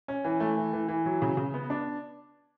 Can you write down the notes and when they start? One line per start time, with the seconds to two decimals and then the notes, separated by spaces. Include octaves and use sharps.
0.08 C#4
0.24 E3
0.40 A3
0.57 E3
0.73 E3
0.88 E3
1.06 F#3
1.22 C#3
1.37 C#3
1.54 B3
1.70 D4